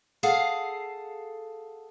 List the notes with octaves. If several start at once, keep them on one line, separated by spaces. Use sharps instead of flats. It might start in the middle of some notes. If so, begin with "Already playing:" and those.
G#4 A4 F5 F#5